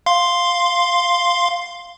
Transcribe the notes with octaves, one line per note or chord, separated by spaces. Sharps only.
F5 C6